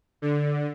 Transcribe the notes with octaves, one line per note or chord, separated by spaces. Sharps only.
D3